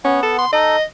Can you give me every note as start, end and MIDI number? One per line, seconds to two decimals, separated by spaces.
0.04 0.45 59
0.04 0.22 61
0.04 0.45 78
0.23 0.38 69
0.38 0.52 84
0.53 0.76 63
0.53 0.76 69
0.53 0.83 75